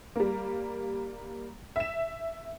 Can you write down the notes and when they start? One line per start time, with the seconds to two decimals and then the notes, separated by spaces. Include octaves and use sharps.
0.16 G3 A#3
1.76 E5 E7